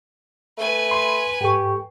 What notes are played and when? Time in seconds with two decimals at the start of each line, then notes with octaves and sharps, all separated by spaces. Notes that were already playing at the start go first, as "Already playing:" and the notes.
0.58 A3 B4 G#5
0.91 B5 C6
1.41 G#2 G4 A4 C#6